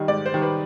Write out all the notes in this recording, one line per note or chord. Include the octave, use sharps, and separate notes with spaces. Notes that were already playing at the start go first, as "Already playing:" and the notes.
Already playing: D#3 G3 D#5
G#2 D5
C5
D#3 G3
B4